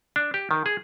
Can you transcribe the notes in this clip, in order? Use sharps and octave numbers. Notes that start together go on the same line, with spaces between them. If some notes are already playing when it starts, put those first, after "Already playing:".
D4
G4
D#3
G#4